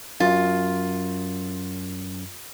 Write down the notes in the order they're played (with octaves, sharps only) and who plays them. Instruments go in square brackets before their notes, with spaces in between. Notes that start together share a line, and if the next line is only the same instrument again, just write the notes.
[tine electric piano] F#2 [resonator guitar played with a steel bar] F4